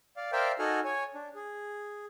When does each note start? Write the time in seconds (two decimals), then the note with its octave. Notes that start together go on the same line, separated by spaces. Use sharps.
0.16 D5 F5
0.32 A#4 C5 D5 E5 F5 G5
0.59 D#4 F#4 A4 F#5 G#5 F6
0.84 C#5 G#5
1.15 D4
1.35 G#4